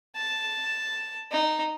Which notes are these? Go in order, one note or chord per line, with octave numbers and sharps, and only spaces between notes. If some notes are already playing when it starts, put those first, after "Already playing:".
A5
D#4